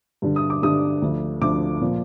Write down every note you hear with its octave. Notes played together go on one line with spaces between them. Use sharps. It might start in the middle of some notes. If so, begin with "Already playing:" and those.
G2 D3 G3
D#6
D6
G2 D3 G3 D#6
D2 D3 F3
D2 D3 F3 D6
A#2 F3